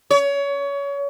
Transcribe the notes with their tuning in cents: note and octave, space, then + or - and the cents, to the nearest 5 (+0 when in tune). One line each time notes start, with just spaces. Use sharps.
C#5 +25